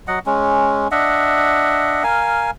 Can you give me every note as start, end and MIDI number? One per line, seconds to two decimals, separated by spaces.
0.08 0.19 54
0.08 0.19 75
0.08 0.19 78
0.26 0.88 56
0.26 0.88 61
0.91 2.03 62
0.91 2.03 75
0.91 2.03 76
0.91 2.03 78
2.04 2.51 70
2.04 2.51 77
2.04 2.51 80